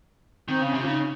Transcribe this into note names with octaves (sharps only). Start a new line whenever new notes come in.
D#3 C4
C#3
C#4
C3
F4
C#3 D#4